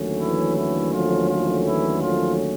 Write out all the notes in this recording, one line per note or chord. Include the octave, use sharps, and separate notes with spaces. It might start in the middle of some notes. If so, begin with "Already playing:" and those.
Already playing: D#2 D3 F#3 A3 C#4
E3 E4
E3 E4
F3 F4
F3 F4
E3 E4
F3 F4